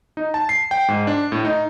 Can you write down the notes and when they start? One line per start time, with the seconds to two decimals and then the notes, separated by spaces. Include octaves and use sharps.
0.17 D#4
0.34 A5
0.49 C7
0.71 G5
0.88 G#2
1.07 D4
1.32 A2
1.45 D#4